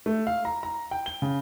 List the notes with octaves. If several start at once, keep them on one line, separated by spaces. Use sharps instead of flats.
A3
F5
A#5
A#5
G5
G7
C#3